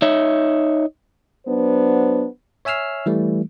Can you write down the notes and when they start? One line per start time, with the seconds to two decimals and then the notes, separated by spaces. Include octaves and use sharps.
0.02 D#4 C#5 E5
1.46 F#3 B3 D4 C5
2.65 C#5 E5 G#5 E6 F6 C7
3.06 E3 G3 A3